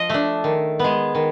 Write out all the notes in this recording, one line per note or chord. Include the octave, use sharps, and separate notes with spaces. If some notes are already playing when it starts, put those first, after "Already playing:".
Already playing: F3 D#5
A3 D4
D#3
G#3 B3
D#3